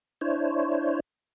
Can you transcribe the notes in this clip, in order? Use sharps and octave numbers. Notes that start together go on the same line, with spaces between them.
D4 E4 C5 C#5